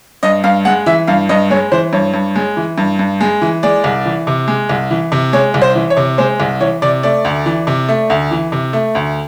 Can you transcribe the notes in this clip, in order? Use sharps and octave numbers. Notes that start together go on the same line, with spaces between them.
G2 D#5
G2 F5
G#3 F#5
E3 E5
G2 F5
G2 D#5
G#3 C#5
E3 C5
G2 C#5
G2
G#3
E3
G2
G2
G#3
E3
G#3 D5
C2
E3
C3
G#3
C2
E3
C3
G#3 C#5
C2
C5
E3
C#5
C3
G#3 C5
C2
E3 C#5
C3 D5
A3 D5
D2
E3
C3
A3
D2
E3
C3
A3
D2